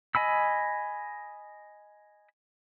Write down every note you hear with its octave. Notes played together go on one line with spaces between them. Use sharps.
D#5 G#5 B5 E6